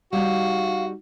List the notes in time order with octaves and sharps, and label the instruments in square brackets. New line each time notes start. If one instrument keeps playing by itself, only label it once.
[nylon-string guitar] G3 D#4 [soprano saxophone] F#4 [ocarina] F5